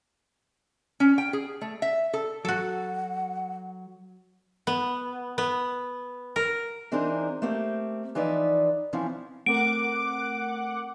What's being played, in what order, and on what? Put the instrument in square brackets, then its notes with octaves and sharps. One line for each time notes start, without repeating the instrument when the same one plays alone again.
[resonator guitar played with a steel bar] C#4
G5
G#4
A3
E5
A4
[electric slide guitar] F#3 [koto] F#4 A4 [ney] F#5
[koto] B3
B3
A#4
[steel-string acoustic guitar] E3 C4 D4 D#4 G#4 A#4
A3 A#3 C4 G4
E3 F3 D#4 B4 D5 E5
E3 F3 C4 C#4 E4
[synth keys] A3 C4 A#4 [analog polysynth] F#5 D6 [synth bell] D7